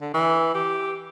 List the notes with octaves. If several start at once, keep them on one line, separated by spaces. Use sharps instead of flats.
D3
E3
G4